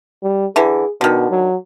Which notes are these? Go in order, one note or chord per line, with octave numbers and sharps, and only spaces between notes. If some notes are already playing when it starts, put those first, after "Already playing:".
G3
D3 E3 G#4
B2 D3 D#3
F#3